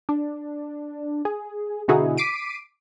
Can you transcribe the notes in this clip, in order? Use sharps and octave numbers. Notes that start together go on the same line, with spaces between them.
D4
G#4
B2 D3 D#4 E4 F#4 G#4
D6 B6 C7 D7 D#7